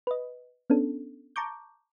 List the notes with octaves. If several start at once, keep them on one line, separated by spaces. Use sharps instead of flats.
B4 D#5
B3 C#4 D4 A4
A5 A#5 C#6 D6 G6